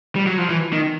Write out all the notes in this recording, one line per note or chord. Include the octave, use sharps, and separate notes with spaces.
G3
F#3
F3
E3
D#3